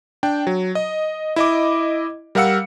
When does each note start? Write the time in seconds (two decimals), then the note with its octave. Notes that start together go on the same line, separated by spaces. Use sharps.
0.23 D4 G5
0.47 F#3
0.75 D#5
1.36 E4 D#5 D6
2.35 G3 A#4 F5 F#5 E6 C#7